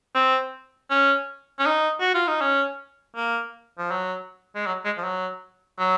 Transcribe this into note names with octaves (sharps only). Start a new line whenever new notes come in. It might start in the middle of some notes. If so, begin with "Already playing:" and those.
C4
C#4
C#4
D#4
F#4
F4
D#4
C#4
A#3
F3
F#3
G#3
F#3
G#3
F3
F#3
F#3